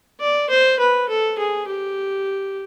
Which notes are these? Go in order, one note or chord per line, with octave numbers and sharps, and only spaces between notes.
D5
C5
B4
A4
G#4
G4